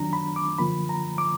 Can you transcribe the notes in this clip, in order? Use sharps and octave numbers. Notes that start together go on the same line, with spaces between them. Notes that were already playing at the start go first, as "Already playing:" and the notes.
Already playing: F#2 D#3 F#3 D4 A#5
B5
D6
F#2 D3 F3 A#3 B5
A#5
D6